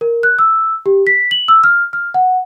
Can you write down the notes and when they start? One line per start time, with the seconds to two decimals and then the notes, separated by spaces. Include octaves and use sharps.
0.01 A#4
0.23 F#6
0.39 E6
0.86 G4
1.07 B6
1.31 F#7
1.48 E6
1.64 F6
1.93 F6
2.14 F#5